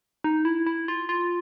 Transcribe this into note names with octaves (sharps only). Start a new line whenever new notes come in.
D#4
E4
E4
F4
F4